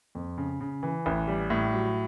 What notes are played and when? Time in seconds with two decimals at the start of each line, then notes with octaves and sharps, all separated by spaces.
0.15 F2
0.38 C#3
0.60 C#3
0.83 E3
1.06 A1
1.28 G3
1.50 A2
1.73 F#3